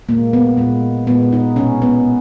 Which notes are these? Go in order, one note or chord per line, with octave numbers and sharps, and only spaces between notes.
A#2 G#3 A#3
B3
A#2 G#3
A#2 G#3 B3
D#4
B2 G#3 C#4
B3